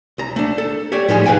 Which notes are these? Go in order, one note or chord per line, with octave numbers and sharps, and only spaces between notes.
C2 A#5
A3 D4
A4
G4 C#5 D5
A2 F3 G#3 D#4 G4 G#4
G#4 B4 D#5 F5 G5 G#5